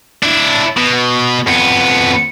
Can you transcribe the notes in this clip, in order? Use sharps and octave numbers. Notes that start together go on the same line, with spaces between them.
D4 E4
B2
F2 B3